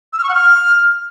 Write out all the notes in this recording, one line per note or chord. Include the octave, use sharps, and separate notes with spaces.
E6
F6
C#6
F#5
F6